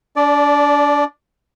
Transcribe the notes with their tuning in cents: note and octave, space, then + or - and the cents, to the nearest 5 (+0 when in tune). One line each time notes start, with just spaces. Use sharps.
D4 -30 D5 +0